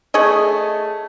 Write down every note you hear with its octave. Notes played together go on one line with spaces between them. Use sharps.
A3 G#4 C#5 D#5